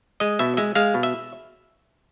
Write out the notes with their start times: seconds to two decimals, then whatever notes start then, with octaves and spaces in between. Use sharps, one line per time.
0.20 G#3 D#5
0.39 B2 E5
0.57 G#3 E5
0.75 G#3 F5
0.94 B2
1.03 E5